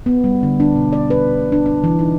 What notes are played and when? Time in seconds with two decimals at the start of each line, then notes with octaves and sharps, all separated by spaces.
0.06 B3
0.24 G3
0.43 D3
0.60 D4
0.76 B2
0.93 D5
1.10 B4
1.52 D4
1.66 D4
1.84 E3
1.99 D#4